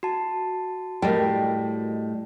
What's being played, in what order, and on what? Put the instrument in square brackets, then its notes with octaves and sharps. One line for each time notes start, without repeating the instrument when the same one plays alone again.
[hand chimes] F#4 A5
[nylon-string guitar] A2 G3 [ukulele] A#4 D#5 G5